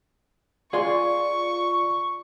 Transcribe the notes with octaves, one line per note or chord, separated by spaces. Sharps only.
F4 G#4 D5 G#5 C6 C#6